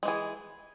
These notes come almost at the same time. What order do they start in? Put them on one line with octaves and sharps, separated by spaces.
G#3 E3 G#4